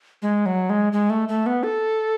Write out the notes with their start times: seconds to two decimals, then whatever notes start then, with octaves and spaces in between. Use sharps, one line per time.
0.22 G#3
0.46 F#3
0.70 G#3
0.93 G#3
1.10 A3
1.29 A3
1.46 B3
1.63 A4